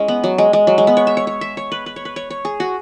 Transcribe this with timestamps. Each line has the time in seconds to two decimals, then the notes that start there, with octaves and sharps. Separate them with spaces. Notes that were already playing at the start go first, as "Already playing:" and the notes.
Already playing: G#3 C#4 E4
0.08 B3
0.24 F#3
0.38 G#3
0.53 G#3
0.67 F#3
0.78 G#3
0.87 B3
0.97 C#5
1.07 E5
1.17 C#5
1.27 C#5
1.41 E5
1.57 C#5
1.72 B4
1.86 B4
1.96 C#5
2.05 B4
2.16 C#5
2.30 C#5
2.45 G#4
2.60 F#4